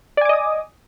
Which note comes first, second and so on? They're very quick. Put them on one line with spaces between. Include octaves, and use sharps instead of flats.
D5 G#5 D6 D#5 D#6